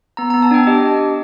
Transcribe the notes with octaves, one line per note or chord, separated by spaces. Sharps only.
B3 A#5
B3 A#5
A5
D4 G5
G4 D#5